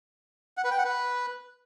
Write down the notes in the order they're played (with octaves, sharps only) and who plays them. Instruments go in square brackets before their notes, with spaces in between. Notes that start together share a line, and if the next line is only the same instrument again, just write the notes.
[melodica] F#5
B4
G5
F#5
B4